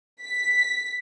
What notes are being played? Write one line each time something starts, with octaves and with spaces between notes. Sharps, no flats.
B6